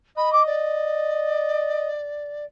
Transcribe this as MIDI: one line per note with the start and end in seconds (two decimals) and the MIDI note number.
0.17 1.88 75
0.17 0.32 83
0.32 0.42 86
0.46 2.45 74